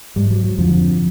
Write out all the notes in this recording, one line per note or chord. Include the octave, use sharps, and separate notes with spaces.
G#2 G3
F#3
F#3
F2 D3 F3